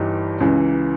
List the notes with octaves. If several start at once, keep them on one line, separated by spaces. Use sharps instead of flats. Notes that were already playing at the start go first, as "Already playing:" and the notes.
Already playing: G1 G2 E3 D#4 G4
C#2 C#3 E3